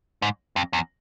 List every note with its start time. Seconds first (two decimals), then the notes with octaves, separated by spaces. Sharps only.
0.22 G#2
0.56 F2
0.73 E2